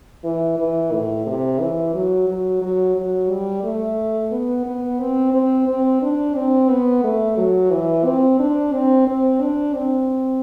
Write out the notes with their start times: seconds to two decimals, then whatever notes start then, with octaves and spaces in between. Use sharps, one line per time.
0.24 E3
0.59 E3
0.92 A2
1.26 C3
1.60 E3
1.94 F#3
2.28 F#3
2.62 F#3
2.96 F#3
3.30 G3
3.64 A3
4.32 B3
4.66 B3
5.00 C4
5.34 C4
5.68 C4
6.02 D4
6.36 C4
6.69 B3
7.04 A3
7.37 F#3
7.71 E3
8.05 C4
8.39 D4
8.73 C4
9.07 C4
9.41 D4
9.75 C4